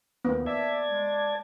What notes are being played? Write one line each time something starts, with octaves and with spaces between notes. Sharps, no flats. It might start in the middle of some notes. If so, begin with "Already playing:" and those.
D#2 A#3 B3
D5 E5 A5 G#6
G#3